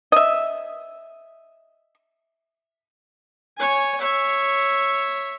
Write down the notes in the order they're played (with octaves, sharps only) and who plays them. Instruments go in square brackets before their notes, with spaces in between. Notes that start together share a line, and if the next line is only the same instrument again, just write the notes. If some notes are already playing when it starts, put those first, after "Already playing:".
[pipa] D#5 E5
[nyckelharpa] C#5 G#5
C#5 E5